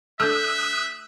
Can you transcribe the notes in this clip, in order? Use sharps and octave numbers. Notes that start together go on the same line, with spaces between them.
A3 D4 E5 D#6 E6 F#6 G6